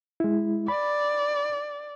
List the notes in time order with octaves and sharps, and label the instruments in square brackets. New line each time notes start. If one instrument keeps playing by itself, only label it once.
[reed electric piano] G#3 E4
[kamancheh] D5 [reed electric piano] B5